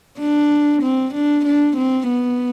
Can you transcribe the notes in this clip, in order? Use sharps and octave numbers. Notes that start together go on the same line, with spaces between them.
D4
C4
D4
D4
C4
B3